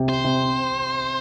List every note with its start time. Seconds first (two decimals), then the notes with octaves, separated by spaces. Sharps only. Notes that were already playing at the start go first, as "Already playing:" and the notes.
Already playing: C3
0.09 C5
0.24 C3